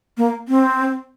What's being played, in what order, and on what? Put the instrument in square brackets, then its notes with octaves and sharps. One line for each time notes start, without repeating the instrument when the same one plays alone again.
[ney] A#3
C4